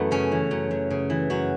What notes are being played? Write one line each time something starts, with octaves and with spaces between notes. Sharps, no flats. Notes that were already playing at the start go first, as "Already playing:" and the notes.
Already playing: F#2 E3 A3 B3
C#3 C#4
E3
F#2
F#2
C#3
E3
F#2 F#4